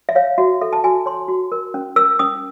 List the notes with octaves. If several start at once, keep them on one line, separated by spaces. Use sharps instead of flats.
E5
C#5 F5
F#4 E5
A4 E5
A5
F#4 G#5
C#5 C6
F#4
A#4
C#4
A#4 E6
C#4 D#6